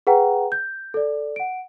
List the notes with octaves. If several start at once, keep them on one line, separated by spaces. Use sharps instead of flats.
G#4 B4 F#5 G5 A#5
G6
A4 D5
F#5 D7